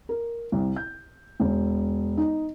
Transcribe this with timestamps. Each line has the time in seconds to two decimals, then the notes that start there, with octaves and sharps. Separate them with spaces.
0.09 A#4
0.52 C2
0.76 G6
1.40 E1
2.17 D#4